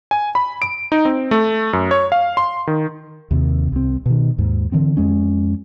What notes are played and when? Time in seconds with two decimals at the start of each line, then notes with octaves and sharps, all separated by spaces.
0.11 G#5
0.35 B5
0.62 D7
0.92 D#4
1.05 C4
1.31 A3
1.73 F#2
1.91 C#5
2.12 F5
2.37 C6
2.67 D#3
3.31 D#2 C3
3.72 C2 C4
4.06 B2 D#3
4.38 D#2 G#2
4.72 D3 E3 C4
4.97 F2 G#3 C#4